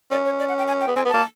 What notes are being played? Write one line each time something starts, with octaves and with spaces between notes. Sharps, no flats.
C#4 D5
C#5
D5
F#5
G5
G#5
G5
B3
C4 G#5
B3
A#3 A5